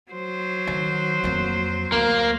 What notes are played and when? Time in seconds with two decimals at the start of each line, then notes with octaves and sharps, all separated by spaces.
0.12 F#3 C5
0.67 D#3
1.24 F2 A#3
1.92 D2 A#3